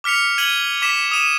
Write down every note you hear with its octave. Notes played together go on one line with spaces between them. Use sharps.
D6 F6 B6 C#7 F7
G#6 D#7 F#7 G7
D6 B6 E7
D#6 D#7 E7